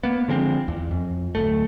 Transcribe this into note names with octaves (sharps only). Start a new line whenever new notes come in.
A#3 B3
D3 F3 G#3 C4
E2
F2
D1 E2 A3